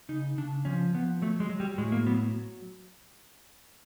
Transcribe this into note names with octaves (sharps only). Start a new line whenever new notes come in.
C#3 D#4
C#3 D4
F3 C#4
F3 B3
F#3 A3
G#3
F#3
G3
A2 G#3
A#3
F#3 B3